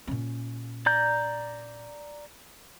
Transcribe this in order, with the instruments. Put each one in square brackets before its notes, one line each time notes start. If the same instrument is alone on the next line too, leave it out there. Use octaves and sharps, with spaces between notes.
[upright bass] A#2 C#4
[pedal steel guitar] D5 A#5 G6